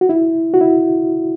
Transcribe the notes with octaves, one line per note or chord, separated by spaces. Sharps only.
F#4
E4
F#4
E4